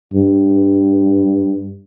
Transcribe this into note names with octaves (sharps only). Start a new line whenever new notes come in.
G2